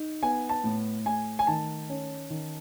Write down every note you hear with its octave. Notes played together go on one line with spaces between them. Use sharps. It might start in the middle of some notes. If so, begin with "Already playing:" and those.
Already playing: D#4
B3 G#5
A5
A2
A3 G#5
G#5
D#3 A5
C#4
D#3